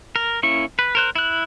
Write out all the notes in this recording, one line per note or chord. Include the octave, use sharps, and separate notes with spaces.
A#4
A#3 C#4 E4 C#6
B4
A#4 C5 F#6
E4 F#6